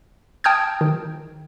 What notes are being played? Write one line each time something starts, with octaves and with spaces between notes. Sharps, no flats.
G5 A5 D#6 F6 G6 G#6
D#3